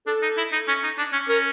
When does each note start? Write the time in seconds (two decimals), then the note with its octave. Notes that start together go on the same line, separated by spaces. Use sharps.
0.07 D4 A4
0.22 D#4
0.37 E4
0.52 D#4
0.68 C#4
0.83 D#4
0.98 D4
1.13 C#4
1.28 C#4 A#4